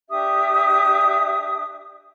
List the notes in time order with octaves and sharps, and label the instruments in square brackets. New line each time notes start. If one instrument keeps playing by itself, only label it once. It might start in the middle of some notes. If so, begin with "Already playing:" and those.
[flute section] D4 G4 E5 D#6